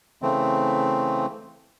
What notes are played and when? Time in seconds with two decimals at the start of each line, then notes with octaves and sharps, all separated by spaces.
0.22 C#3 E3 A3 C4